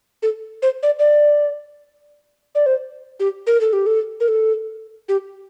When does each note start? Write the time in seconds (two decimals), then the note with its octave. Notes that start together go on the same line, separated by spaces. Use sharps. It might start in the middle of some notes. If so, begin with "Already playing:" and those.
0.23 A4
0.62 C5
0.83 D5
0.99 D5
2.55 D5
2.66 C5
3.20 G4
3.47 A#4
3.61 A4
3.73 G4
3.86 A4
4.20 A#4
4.28 A4
5.09 G4